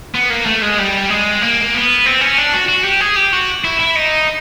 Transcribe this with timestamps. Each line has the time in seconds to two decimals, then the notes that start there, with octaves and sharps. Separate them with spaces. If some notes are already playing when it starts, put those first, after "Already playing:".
0.15 B3
0.30 A#3
0.46 A3
0.62 G#3
0.79 G3
1.09 G#3
1.42 A#3
1.74 B3
2.05 C4
2.21 C#4
2.38 D4
2.53 F#4
2.68 F#4
2.84 G4
3.01 G#4
3.16 G4
3.33 F#4
3.64 E4
3.80 E4
3.96 D#4